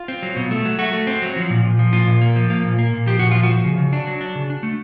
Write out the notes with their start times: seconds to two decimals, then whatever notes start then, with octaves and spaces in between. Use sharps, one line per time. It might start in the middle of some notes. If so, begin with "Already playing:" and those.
Already playing: F4
0.08 C4
0.22 F#3
0.36 B2
0.51 A3
0.65 F#3
0.79 A3 F#4
0.93 A3
1.07 C4
1.22 F#3
1.36 F3
1.50 A#2
1.64 A#2
1.79 F3
1.93 A#2 F4
2.08 A#2
2.21 A#3
2.36 F3
2.50 A#3
2.64 A#2
2.79 A#3
2.93 A#2
3.06 F3 G4
3.19 A#2 F#4
3.31 F3 F4
3.43 F#4
3.50 F3
3.64 C#3
3.78 C#3
3.93 D4
4.07 F#3
4.21 D4
4.35 C#3
4.50 D4
4.63 A3